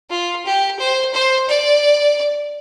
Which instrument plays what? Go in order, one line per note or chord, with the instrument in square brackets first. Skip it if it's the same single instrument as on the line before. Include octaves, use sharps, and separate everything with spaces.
[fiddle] F4
G4
C5
C5
D5